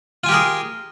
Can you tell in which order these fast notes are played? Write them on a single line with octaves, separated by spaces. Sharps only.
F4 G#5 G4 A#4 G#4